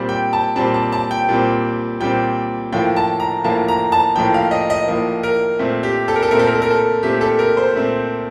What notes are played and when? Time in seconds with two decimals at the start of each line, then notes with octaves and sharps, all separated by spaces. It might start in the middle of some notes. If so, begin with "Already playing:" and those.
Already playing: A#2 G3 C4
0.09 G5
0.33 A5
0.56 A#2 G3 C4 A5
0.74 A5
0.92 A5
1.11 G5
1.29 A#2 G3 C4
2.00 A#2 G3 C4 G5
2.73 A2 F3 A#3 G5
2.96 A5
3.20 A#5
3.44 A2 F3 A#3 A5
3.68 A#5
3.92 A5
4.15 A2 F3 A#3 G5
4.34 F5
4.51 D#5
4.70 D#5
4.88 A2 F3 A#3
5.23 A#4
5.59 A#2 A3 C4
5.83 G4
6.08 A4
6.16 A#4
6.23 A4
6.31 A#2 A3 C4 A#4
6.39 A4
6.47 A#4
6.55 A4
6.62 A#4
6.71 A4
7.03 A#2 A3 C4 G4
7.21 A4
7.39 A#4
7.57 C5
7.75 A#2 A3 C4